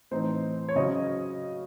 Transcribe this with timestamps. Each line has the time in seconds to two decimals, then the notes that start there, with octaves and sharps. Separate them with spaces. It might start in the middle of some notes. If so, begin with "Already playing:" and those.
0.11 A2 E3 C4 D#4 C5
0.69 C#5
0.75 C#3 F#3 C#4 D#5